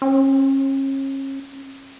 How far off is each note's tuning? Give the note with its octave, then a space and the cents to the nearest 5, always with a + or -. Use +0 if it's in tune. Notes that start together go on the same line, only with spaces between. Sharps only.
C#4 -35